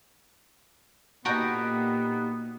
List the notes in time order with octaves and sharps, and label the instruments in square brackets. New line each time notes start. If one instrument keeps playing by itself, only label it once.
[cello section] A#2 [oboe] B3 [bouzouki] D#4 G4 A4 [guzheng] F#4 G5 A#5